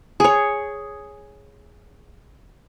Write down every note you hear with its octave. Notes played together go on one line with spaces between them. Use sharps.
G#4 C#5